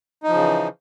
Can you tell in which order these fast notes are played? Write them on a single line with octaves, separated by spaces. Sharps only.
D#4 F3 C#3 E3